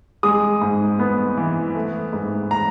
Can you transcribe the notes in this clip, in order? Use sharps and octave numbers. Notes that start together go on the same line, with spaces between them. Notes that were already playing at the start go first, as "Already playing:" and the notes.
G#3 D#6
G#2
B3
E3
A3
G#2
A#5